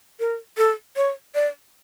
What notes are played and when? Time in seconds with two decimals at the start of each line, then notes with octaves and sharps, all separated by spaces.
0.20 A#4
0.58 A4
0.96 C#5
1.35 D5